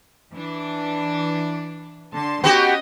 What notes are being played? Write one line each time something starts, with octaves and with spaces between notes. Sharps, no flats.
E3 D4
D3 A5 C6
B3 C#4 F#4 G4 D#5